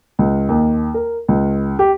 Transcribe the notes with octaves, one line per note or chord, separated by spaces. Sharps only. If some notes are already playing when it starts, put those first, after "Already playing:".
C#2
D#2
A#4
C#2
G4